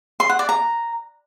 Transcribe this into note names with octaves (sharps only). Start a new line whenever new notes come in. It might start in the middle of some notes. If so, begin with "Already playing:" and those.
C6
F#5
D5
A#5